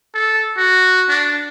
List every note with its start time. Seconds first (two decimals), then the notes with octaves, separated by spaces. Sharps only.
0.14 A4
0.57 F#4
1.09 D4